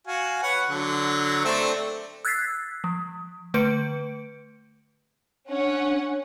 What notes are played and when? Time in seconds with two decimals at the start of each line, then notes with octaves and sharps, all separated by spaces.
0.07 F#4 F5 G#5
0.43 B4 C#5 F#5
0.69 D3 F#3
1.44 A3 C4 D4
2.25 E6 F#6 G#6 A6 B6 C7
2.84 F3
3.54 D3 A3 B4 C#7 D7
5.49 C#4 D4 F#5